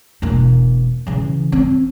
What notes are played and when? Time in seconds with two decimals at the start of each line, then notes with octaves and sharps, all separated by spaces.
0.22 E1 A#3
1.07 C#3 E3
1.52 C4